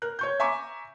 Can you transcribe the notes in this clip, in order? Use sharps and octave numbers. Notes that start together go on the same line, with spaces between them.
A#4 F#6
C#5 C#6 G6
E5 G#5 A#5 C#6 D6